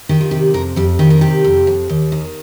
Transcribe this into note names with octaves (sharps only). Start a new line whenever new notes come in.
D#3 G4
F4
C3 G4
F2 A#4
F2 G4
D#3 G4
A#4
C3 G4
F2
F2
D#2
D#3